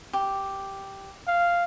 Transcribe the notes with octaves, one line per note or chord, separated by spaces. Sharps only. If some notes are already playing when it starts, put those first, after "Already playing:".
G4
F5